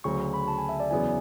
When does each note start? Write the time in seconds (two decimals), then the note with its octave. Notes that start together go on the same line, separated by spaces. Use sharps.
0.04 D2 C#3 F#3 C#6
0.19 C#6
0.33 B5
0.48 A5
0.58 G#5
0.69 E5
0.80 D5
0.90 E2 C#3 F#3 B3 E4 G#5